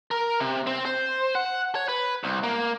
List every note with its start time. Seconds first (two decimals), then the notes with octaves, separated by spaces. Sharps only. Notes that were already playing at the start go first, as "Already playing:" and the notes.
0.11 A#4
0.40 C3
0.67 C4
0.85 C5
1.35 F#5
1.75 C#5
1.89 B4
2.24 C2
2.44 A#3